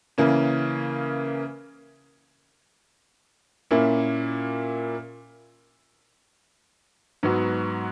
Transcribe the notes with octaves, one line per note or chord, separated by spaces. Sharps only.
C#3 E3 A#3 C#4
A#2 A#3 C#4 E4
G#2 F#3 B3 F#4